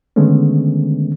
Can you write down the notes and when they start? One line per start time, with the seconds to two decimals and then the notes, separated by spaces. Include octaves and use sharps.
0.16 D3 D#3 G#3 A3 B3 C#4